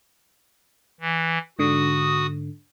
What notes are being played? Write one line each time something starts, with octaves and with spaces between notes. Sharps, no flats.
E3
G#2 D3 F#4 D#6